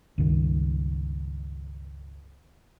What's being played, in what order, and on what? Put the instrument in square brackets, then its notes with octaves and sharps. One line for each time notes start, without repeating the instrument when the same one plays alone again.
[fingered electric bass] C#2 G2 D#3